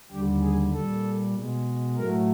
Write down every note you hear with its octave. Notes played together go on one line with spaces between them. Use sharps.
D#2 D3 G3 G4
G#4
A#2 G3 A4
B2 G#3
A2 F#3 A3 A#4